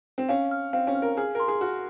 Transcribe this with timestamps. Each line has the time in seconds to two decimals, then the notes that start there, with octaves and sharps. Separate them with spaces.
0.18 C4
0.29 C#4 F5
0.51 F6
0.73 C4 F5
0.87 C#4
0.95 F6
1.02 A#4
1.17 G#4 F6
1.35 A#4 C6
1.48 G#4
1.61 F#4 F6